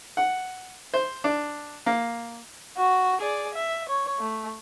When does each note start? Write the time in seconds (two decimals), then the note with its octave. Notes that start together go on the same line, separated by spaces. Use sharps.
0.17 F#5
0.94 C5
1.24 D4
1.86 A#3
2.77 F#4
3.21 G#4 D5
3.54 E5
3.89 C#5
4.19 A3